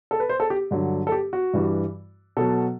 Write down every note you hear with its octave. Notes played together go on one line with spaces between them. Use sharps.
A4
B4
C5
A4
G4
G2 D3 F#3
A4
G4
F#4
G2 E3 G3
B2 F#3 A4